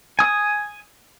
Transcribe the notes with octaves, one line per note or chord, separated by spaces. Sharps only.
G#5 D#6